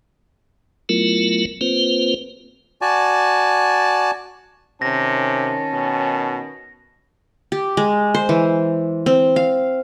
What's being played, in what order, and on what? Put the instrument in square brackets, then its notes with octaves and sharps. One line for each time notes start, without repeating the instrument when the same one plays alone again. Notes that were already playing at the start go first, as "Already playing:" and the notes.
[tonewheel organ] F#3 A3 B3 E4 F4 A#4
A#3 C4 F4 B4 C5
[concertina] F#4 D5 G#5 A5
[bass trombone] C3 [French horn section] D#3 C#4 [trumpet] A5 [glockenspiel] A#6
[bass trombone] B2
[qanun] G4
G#3
C5
E3
C4
F5